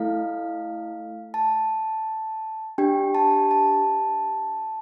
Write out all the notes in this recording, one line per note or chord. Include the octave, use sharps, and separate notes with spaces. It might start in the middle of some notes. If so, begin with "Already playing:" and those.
Already playing: A3 E4 A4 F5
A5
D4 G4 G5
A5
A5